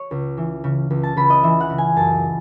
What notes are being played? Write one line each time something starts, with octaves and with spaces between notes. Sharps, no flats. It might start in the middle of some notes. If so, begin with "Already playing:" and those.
Already playing: C#5
C#2
E3
C#3
C#2
A5
C#2 B5
D#5
E3 E5
F#5
C#3
G#5
F#2 A5